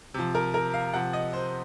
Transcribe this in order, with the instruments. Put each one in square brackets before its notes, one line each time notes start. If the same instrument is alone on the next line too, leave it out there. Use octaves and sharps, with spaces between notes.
[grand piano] C3 F3
A#4
A#4
F5
C3 F3 F#5
D#5
C5